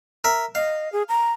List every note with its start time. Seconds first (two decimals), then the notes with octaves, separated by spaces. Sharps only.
0.24 A#4 E5
0.55 D#5 F5
0.92 G#4
1.09 A#5